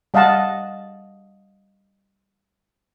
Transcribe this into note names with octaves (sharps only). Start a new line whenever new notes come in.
G3 D#5 F5 F#5 A5